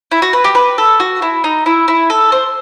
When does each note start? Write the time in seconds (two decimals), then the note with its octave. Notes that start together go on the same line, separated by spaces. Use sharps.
0.11 E4
0.22 F#4
0.33 B4
0.44 G4
0.55 B4
0.78 A4
1.00 F#4
1.22 E4
1.44 D#4
1.66 E4
1.88 E4
2.10 A4
2.32 C5